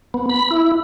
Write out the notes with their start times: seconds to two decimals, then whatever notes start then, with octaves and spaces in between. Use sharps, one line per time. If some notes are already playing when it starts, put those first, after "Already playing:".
0.14 B3
0.29 B5
0.51 E4